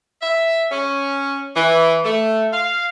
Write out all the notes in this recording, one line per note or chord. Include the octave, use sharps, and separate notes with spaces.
E5
C#4
E3
A3
F5